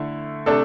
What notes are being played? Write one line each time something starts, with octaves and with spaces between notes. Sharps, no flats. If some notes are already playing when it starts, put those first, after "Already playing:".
Already playing: D3 A3 E4
C3 A3 D4 A4